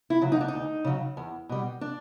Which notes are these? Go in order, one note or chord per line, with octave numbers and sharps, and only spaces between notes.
E4
C#3 F#3
D#4
D4
D#4
D2
C#3 F#3
E2
B2 G3
D4